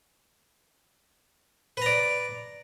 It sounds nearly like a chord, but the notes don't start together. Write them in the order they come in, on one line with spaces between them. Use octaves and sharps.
B4 A#5 D5